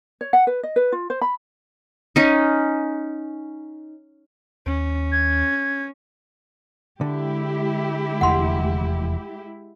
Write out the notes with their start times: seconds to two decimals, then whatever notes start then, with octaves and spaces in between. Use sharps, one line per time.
0.21 C#5
0.33 F#5
0.47 B4
0.63 D#5
0.76 B4
0.92 F4
1.10 C5
1.21 B5
2.16 C#4 D#4
4.66 D#2 C#4
5.12 G#6
7.01 D3 G#3 E4 G4
8.21 F1 E2 A3 F#5 C6